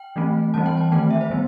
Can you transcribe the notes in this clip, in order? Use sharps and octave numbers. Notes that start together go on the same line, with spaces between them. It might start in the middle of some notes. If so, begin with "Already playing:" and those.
Already playing: G5
E3 A3 C4
E3 G3 C4 A5
G5
A5
D#3 A3 C4 G5
E5
C5
D#3 G3 B3